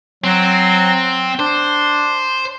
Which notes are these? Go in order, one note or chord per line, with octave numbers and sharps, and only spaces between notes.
F#3 C4
D4 C5